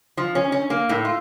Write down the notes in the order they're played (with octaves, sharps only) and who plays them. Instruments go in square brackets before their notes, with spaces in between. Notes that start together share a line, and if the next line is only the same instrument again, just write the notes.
[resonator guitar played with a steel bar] F3
C#4
C#4
A#3
A2
F4